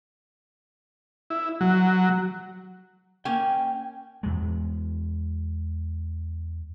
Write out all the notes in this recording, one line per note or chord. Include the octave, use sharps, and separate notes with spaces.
E4
F#3
A#3 C#4 G5 G#5
E2 G#3